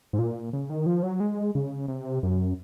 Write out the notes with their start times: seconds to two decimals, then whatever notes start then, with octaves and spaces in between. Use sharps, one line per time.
0.13 G#2
0.19 A#2
0.53 C#3
0.70 D#3
0.86 F3
1.03 F#3
1.20 G#3
1.55 C#3
1.88 C3
2.23 F#2